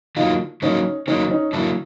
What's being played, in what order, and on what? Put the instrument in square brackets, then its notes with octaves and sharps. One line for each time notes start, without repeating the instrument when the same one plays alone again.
[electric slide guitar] D3 F#3 A#3 [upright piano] D#4 F4
[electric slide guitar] D3 F#3 A#3 [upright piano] C#4 D#4
[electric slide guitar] D3 F#3 A#3 [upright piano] C#4 D#4
[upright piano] C#4 D#4
[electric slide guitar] D3 F#3 A#3 [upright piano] D4 E4